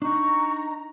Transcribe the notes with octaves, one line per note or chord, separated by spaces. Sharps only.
D4 D#4 A#5 C#6